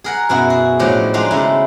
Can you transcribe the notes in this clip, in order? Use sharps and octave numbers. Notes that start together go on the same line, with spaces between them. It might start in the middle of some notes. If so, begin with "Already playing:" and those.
G#4 A#4 F#5
F#2 B2 E4 F#4 F#5
G#4
A2 F3 F#3 D4 C#5 D#5
G#3 D4 D#4 F4 F#4 F5
C#3 G#3 A3 E4